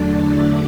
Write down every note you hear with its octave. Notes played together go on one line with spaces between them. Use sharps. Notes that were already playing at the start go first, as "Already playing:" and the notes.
Already playing: E2 D3 F#3 A3 D4 D5